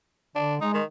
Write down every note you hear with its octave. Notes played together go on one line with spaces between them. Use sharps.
D3 D4
G#3 D#4
D#3